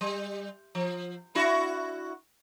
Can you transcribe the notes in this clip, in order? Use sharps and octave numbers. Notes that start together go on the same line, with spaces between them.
G3
F3
D4 E4 F#4